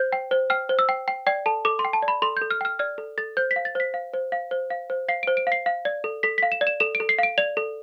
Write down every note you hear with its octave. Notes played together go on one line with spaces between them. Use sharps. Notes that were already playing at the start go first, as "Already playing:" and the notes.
Already playing: C5 G6
G5
C5
G5 F6
C5
E6
G5
G5
D5 G5
A4 A5
A4 D6
C6
G5
A5
D5
B5
A4 C6
A4 G6
F6
G5 F6
D5 F6
A4
A4 A6
C5 G6
B6
F5
A6
C5 B6
F5
C5
F5
C5
F5
C5
F5 C7
C5 D7
D7
F5 C7
F5
D5
A4
A4 B6
F5 B6
E7
D5
E7
A4 E7
D7
A4
C7
F5 D7
D5 F7
A4